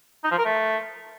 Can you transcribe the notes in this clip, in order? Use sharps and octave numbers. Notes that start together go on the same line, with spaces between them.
D#4
F3
A#4
A3